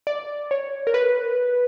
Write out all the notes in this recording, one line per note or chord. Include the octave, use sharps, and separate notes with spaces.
D5
C#5
A#4
B4